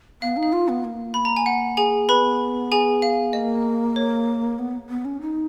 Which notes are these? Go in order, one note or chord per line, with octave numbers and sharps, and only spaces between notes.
B3 F5
D#4
F5
F4
B3
A#3
B5
A#5
G#5
F#5
G#4 G#5
B3 B4 B5
G#4 G#5
F5
A#3 D#5
C#5
B3
B3
C#4
D#4